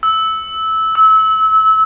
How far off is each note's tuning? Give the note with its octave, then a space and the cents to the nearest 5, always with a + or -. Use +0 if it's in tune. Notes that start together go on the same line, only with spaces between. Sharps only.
E6 -15
E6 -25